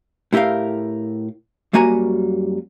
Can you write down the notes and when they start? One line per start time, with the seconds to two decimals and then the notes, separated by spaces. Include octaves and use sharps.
0.33 A2 E4 G4 A#4 F5
1.73 F#2 G3 A#3 F#4 G#5 A#5